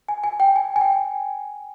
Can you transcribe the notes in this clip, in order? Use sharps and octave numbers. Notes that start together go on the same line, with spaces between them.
G#5
G#5
G5
G#5
G#5
G5